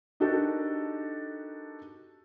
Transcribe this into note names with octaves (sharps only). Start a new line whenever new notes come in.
D4 D#4 F#4 G4 A4 A#4